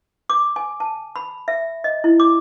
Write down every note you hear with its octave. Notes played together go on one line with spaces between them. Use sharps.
D6
G#5
A5
B5
E5
D#5
E4
D6